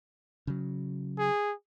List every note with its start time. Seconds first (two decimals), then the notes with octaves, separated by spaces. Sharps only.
0.47 C#3 F#3
1.19 G#4